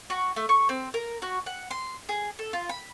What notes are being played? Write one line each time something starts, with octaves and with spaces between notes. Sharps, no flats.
F#4
A3
C#6
C4
A#4
F#4
F#5
C6
G#4
A4
F4
B5